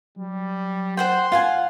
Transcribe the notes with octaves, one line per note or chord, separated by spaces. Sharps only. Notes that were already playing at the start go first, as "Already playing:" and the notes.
F#3 G3
C5 F#5 G5 C6
F4 F5 F#5 G#5